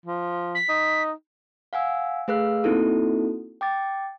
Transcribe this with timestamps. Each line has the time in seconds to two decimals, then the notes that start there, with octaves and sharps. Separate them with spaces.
0.06 F3
0.55 B6
0.69 D#4
1.73 F5 F#5 G#5 E6
2.28 A3 G#4 B4 F5 E6 F#6
2.64 A#3 C4 D#4 E4 F#4 A4
3.61 G5 D6 A6